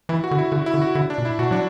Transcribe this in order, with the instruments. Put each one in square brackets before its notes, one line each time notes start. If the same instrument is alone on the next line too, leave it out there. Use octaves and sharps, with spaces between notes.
[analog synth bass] E3 [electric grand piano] E4
[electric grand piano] F#4
[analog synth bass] D3
[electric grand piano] E4
[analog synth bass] D3 [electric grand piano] F#4
[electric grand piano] E4
[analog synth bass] D3
[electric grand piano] F#4
[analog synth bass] D3 [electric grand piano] E4
[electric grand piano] D4
[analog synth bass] B2
[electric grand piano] E4
[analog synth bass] B2 [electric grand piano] F#4
[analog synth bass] F#3 [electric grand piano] D4